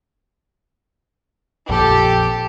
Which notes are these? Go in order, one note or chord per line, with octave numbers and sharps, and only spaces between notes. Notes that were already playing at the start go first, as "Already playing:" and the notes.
A#1 F2 G4 A4